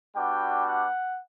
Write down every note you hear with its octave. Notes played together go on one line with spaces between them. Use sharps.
G3 B3 D4 F#4 G5
F#5